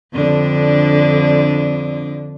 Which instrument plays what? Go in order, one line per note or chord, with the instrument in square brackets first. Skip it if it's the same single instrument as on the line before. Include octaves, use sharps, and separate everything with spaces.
[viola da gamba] F2 D3 D4